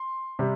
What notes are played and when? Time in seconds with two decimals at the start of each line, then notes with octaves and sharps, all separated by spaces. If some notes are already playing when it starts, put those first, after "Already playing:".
Already playing: C6
0.39 C3 G3